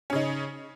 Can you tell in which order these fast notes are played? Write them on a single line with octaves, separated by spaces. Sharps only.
C#4 C#3 D#4